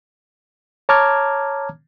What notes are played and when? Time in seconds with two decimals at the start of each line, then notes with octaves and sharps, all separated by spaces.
0.89 C#5 A5 A#5 D6 F6 G#6